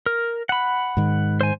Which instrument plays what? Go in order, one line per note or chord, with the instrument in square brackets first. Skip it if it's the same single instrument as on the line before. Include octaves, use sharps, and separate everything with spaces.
[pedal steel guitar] A#4
F#5 B5
[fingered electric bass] G#2 D#3
[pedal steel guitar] C5 G#5